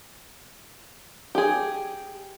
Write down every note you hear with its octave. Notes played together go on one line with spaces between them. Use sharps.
G4 G#4